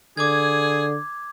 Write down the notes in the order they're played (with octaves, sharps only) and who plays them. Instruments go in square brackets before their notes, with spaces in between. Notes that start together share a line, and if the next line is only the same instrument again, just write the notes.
[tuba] D3 [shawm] G#4 [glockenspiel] D6 G#6